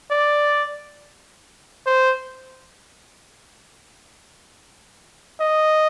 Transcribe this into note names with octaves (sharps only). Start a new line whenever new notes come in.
D5
C5
D#5